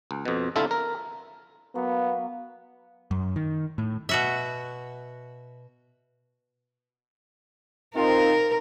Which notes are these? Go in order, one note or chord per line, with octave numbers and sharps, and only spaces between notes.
C#2
F2 B2
C2 D3 E4 F4 A4 E5
A#4
F#3 A#3 B3 F5
F#2
D#3
A2
B2 F#4 E5
C4 D#4 F4 A#4